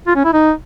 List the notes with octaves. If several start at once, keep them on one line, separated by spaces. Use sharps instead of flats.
F4
C#4
E4
D#4